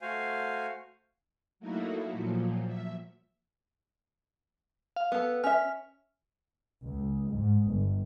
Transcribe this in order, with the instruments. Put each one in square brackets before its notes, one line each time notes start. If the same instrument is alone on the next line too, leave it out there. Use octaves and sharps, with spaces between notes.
[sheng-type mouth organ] A3 F#4 C5 F5 G#5
[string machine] F#3 A3 A#3 D#4 E4 F#4
A#2 F3 F#3
E5
[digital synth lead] F5
[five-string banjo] B3 A4
[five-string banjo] C#4 E5 [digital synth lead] F6
[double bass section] C#2
G#2
G1